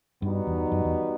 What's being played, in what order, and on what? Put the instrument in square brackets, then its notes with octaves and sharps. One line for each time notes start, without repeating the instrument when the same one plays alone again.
[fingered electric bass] G2 [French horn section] G3 B3 D#4 F#4
[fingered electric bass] E2
F#2
E2